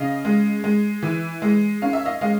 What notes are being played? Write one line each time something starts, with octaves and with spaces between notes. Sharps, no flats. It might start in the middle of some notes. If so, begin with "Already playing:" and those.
Already playing: C#3 D#5 F5
G#3
G#3
E3
G#3
C#4 F5
E5
D#5 F5
G#3 D#5 F5